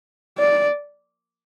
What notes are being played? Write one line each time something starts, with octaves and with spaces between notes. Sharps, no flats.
D5